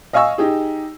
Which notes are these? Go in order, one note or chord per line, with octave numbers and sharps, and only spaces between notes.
D#5 F5 G#5 C#6 E6
D#4 G4 G#4